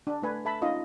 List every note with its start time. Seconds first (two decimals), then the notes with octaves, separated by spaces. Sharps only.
0.07 D4
0.22 A3 D4 B4 G#5
0.45 A4 E5 A5 B5
0.61 C#4 D#4 F4 D#5